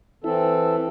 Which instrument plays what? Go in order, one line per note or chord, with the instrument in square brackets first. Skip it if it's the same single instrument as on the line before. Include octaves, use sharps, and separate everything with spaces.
[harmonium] E3 C4 A4 [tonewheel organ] E4